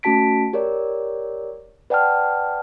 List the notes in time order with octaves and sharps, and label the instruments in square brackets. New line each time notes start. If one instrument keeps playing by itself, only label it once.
[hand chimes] A3 C#4 F#4 A5 B6 D7
G4 A#4 C#5 D5
B4 D5 F#5 G5 A5 F6